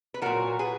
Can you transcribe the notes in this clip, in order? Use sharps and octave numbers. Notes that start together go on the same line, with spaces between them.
B4
A#2 F#3 F#4 A#4
G#4 B4